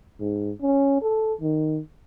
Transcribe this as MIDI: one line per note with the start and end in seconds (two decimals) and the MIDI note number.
0.20 0.51 44
0.62 0.98 61
1.02 1.33 69
1.41 1.80 51